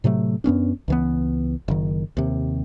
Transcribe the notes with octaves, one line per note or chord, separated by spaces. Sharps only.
A2 C3 F#3 A3
F#2 B3 C#4 D4
C#2 E3 B3
F#1 D#3
D#2 C3